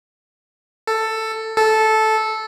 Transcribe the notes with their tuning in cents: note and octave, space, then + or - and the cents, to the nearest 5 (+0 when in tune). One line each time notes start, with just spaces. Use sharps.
A4 +10
A4 -10